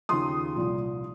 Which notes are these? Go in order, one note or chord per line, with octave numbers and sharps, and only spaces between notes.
D#2 C#3 F3 C6 D#6
C2 A#2 F3